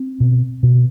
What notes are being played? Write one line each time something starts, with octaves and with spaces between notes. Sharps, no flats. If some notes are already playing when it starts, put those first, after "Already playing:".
Already playing: C4
B2
B2